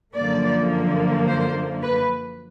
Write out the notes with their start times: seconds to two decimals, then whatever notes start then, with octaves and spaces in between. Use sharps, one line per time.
0.15 F#2 D3 F3 A#3 D5
1.27 C5
1.83 B4